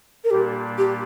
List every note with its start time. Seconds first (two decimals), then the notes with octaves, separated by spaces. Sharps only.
0.24 A#4
0.30 A#2 G3 A#3 D4 G4
0.78 G4